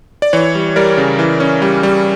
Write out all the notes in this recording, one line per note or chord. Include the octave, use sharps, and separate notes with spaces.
D5
E3 C#5
G3
G3 A#4 D5
C#3
E3
C#4
G3
G3